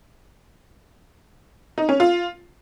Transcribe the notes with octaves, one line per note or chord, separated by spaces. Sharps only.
D#4
C#4
F4